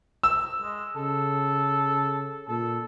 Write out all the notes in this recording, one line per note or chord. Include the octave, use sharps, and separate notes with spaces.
E6
G#3
C#3 A4
A#2 A4